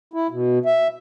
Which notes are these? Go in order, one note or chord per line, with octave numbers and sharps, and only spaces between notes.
E4
B2
E5